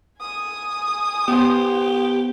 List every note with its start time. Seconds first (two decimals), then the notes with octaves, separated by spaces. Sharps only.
0.21 G#5 D#6
1.28 B3 G4 C5